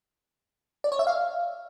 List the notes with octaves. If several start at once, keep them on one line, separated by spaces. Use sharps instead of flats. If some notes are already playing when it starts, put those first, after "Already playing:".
D5
C#5
E5
F5